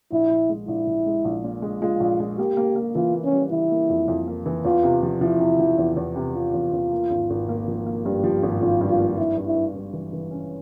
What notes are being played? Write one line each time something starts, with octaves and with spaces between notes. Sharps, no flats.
A#1 E4
A#1
G#3
A#1 E4
A#1
G#3
A#1
A#2
G#3
G#3 F4
A#1
G#3
A#3 G4
A#3
A#3
E3 F4
A#3
C#4
G3
E3 E4
A#3
F2
F2
A#3
E3
E2 F4
C3
F3
F3 E4
C3
F3
E2
E2
C3
C3 F4
E2
E2
A#3
G#1
G#1
A#3
F3
A#3
G2 G4
F3
G#1
G#1 F4
G2
F4
A#3
G2 E4
G2
E4
G2
G2
E3
E3
C#4